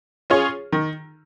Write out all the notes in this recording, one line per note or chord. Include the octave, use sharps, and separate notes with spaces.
C#4 F4 G#4 C#5
D#3